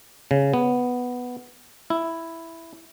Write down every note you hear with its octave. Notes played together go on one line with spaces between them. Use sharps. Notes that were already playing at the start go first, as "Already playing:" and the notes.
C#3
B3
E4